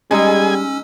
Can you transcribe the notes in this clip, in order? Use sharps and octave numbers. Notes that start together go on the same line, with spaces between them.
G3 G#3 C#4 D#4 G#4 G#5 E6